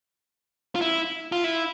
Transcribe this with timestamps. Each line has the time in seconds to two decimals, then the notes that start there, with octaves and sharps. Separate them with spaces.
0.75 F4
0.81 E4
1.32 F4
1.44 E4